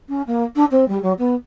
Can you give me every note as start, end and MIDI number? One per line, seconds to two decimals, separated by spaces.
0.09 0.22 61
0.27 0.44 58
0.56 0.65 62
0.71 0.87 60
0.88 1.00 55
1.02 1.13 54
1.18 1.34 59